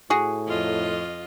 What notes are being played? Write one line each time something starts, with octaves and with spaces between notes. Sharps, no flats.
A2 F#4 G#4
F2 F4 D#5